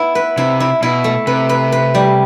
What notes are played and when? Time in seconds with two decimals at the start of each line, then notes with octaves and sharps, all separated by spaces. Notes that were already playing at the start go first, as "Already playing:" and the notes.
Already playing: B3 E4
0.15 B4
0.37 C3 E4
0.60 E4
0.82 B2 E4
1.04 A3
1.27 C3 B4
1.49 B4
1.72 B4
1.95 G3